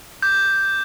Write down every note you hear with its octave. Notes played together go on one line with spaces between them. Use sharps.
D6 G6